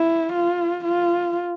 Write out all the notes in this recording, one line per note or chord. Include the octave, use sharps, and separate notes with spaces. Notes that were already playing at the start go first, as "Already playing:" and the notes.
Already playing: E4
F4
F4